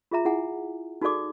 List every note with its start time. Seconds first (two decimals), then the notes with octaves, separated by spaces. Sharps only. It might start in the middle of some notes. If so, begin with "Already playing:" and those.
0.11 F4 G#4 E5 A#5
0.25 E4 G#4 F#5 G#5 A#5
1.02 D#4 F#4 G#4 A4 D5 D6